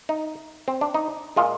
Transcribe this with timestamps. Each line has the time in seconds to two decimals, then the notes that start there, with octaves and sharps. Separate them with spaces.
0.09 D#4
0.68 C4
0.81 D4
0.94 D#4
1.36 A#2 G#3 F4